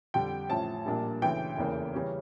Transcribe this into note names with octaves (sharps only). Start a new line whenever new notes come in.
F2 D3 G3 G5
A1 A2 F3 C#4 A5
A#1 A#2 G3 A#3 D4
D2 C#3 E3 G5
F1 E2 C#3 E3 A#3
C#3 E3 G3 C#4